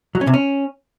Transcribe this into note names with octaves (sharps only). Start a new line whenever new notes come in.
F#3
C#4
C3
C#4